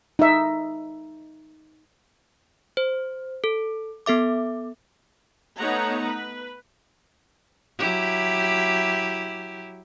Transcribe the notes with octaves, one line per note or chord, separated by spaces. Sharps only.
D#4 E5
C5
A4
B3 A4 E5 D6
A3 B3 D#4 C#5 F#5 A#5
B4
F#3 E4 G4